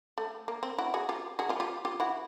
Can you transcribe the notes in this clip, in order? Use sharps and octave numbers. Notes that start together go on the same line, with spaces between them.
A3
A#3
C4
E4 F#4
F#4 G#4
F4 G4
F#4 G#4
F4 G4
F4 G4
F4 G4
E4 F#4